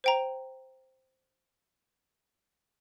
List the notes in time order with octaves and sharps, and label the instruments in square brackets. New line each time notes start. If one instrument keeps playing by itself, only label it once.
[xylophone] C5 G5 A#5